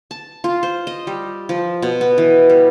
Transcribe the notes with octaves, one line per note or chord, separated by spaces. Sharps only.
A5
F4
C5
D#5
G3
F3
B2
B3
E3
G3